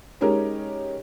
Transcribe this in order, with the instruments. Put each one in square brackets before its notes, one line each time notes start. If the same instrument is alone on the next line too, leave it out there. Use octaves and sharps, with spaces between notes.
[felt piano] G#3 C#4 D#4 G4 A#4